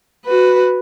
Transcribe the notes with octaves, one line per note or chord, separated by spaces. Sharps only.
F#4 B4